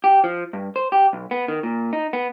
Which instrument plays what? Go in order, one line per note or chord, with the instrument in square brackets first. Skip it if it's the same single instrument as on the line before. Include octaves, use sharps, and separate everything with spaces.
[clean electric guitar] G4
F3
G2
C5
G4
B1
B3
D#3
A#2
D#4
B3